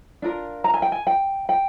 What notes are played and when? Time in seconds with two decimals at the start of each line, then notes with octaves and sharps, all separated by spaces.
0.22 D4 F4 A#4
0.64 A#5
0.74 G#5
0.82 G5
0.92 G#5
1.07 G5
1.49 G5